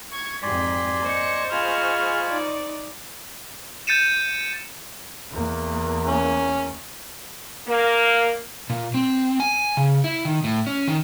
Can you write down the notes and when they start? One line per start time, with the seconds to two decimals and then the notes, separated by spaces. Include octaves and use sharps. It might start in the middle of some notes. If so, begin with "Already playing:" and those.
0.13 C#6 G#6
0.43 F2 G#2 G4 D5 G#5 C6 B6
1.02 A#3 C5 D#5 C#6 C#7
1.52 F4 G#4 G#5 B5 F6
2.29 D#4 D5
3.87 G6 A6 C#7 D#7 E7
5.31 E2 A#3
6.07 C#4
7.67 A#3
8.70 A#2
8.94 C4
9.40 G#5
9.77 C#3
10.04 E4
10.25 D#3
10.44 A2
10.67 C#4
10.88 D#3